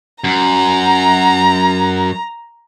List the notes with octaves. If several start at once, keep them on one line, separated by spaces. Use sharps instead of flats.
F#2 A#5